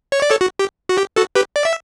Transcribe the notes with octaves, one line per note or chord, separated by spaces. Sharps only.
C#5
D5
A4 C#5
F#4
G4
F#4
G4
F#4 A4
G4 B4
D5
E5